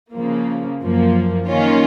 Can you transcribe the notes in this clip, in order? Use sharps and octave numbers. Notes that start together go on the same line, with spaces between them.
C#3 F3 A#3
F#2 F3 A#3
D#3 A#3 C#4 F4